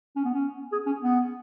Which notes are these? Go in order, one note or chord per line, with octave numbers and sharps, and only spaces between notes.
C#4
B3
C#4
G#4
C#4
B3